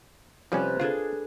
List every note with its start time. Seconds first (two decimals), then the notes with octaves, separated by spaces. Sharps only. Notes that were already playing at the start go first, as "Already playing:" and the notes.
0.52 C3 F3 G3 C#4 B4 A5
0.80 D4 F4 G#4 A4